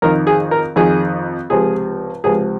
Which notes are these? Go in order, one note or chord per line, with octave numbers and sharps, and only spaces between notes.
F2 D#3 A#4
G#4
A#4
F2 D#3 G#4
C#2 C3 F3 G#4
C#2 C3 F3 G#4